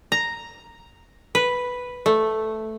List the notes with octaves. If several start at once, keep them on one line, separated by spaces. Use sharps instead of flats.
A#5
B4
A3